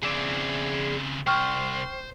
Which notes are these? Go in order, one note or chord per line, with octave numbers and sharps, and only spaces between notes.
C#3 C4 G#4 D5
C2 C5 G5 C#6 F6